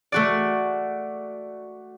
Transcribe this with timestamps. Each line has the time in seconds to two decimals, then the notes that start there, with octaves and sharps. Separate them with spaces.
0.12 A3 F#4 D5